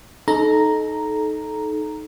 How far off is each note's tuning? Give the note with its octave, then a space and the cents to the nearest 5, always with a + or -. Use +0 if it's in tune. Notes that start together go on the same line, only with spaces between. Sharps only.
D#4 +0 A4 -25 A#5 +0